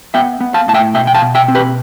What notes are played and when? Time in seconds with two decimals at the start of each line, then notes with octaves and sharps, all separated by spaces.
0.14 B3 E5 G5
0.40 B3
0.54 F5 A5
0.68 A2 A5
0.74 E5 G5
0.94 B2 E5 G5
1.07 G5
1.14 F5 A5
1.22 B2
1.35 E5 G5
1.48 C4
1.55 G4 B4